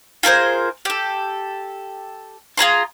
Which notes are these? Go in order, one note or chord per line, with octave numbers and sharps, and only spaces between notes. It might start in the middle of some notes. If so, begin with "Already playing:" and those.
F4 G#4 A#4 C5
G4 A4
F4 G#4 A#5 C6